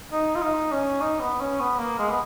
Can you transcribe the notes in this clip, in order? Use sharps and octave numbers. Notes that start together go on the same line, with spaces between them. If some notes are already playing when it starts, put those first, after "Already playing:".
D#4
F4
D#4
C#4
D#4
B3
C#4
B3
A#3
G#3
B3